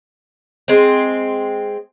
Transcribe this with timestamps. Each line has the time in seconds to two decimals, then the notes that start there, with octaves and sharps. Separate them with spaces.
0.68 G#3 C4